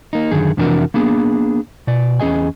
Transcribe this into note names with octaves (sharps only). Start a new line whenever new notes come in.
A#3 D#4
F#2 D3 D#3 G#4
F2 C3 E3 D4 F#4 A#4
A#3 B3 D4 G#4
B2 D5
E2 C#4 G#4 D#5 G#5